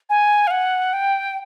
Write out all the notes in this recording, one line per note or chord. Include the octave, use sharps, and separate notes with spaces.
G#5
F5
F#5
G5